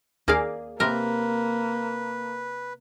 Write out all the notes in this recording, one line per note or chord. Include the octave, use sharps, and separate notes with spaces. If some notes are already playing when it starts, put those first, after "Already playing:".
D#2 A#3 G#4 D5 F5
C3 A#3 A#4 B4